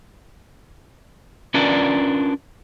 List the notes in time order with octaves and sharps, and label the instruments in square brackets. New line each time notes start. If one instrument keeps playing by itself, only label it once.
[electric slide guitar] C#4 D4 F4 A#4 B4 D5